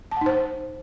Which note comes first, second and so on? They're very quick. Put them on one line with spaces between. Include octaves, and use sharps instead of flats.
A5 F#5 D#4 C5